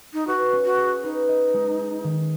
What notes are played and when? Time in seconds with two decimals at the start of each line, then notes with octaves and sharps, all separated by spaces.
0.13 D#4
0.27 F#4 B4
0.53 C#4
0.65 F#4
0.78 G#4
1.03 D#4 B4
1.29 D#5
1.54 G#3
1.79 G#4
2.04 D#3